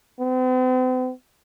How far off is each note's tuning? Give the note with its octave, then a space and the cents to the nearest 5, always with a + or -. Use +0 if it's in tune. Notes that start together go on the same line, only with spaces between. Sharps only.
C4 -45